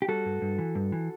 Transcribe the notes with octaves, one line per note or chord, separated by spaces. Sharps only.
G4
G3 F#4 A4
G2
G2
E3
G2
E3